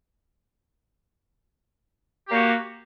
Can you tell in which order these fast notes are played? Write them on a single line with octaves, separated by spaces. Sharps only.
G4 A#3 F#4